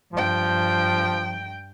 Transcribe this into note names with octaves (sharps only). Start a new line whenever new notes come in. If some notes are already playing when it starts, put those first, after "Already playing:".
G2 F3 G5